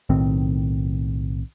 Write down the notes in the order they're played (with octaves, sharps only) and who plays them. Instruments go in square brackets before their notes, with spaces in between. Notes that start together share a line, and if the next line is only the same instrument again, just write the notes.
[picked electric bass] B1 A2 D#3 C4